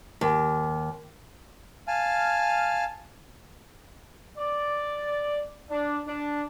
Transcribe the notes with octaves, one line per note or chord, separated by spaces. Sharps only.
D#2
F5 G#5 A5 F6
D5
D4
D4